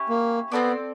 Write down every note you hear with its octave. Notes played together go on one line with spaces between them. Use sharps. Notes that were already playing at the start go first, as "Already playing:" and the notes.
Already playing: C#4 E4 G4
A#3
B3 C4 E4 A4 D5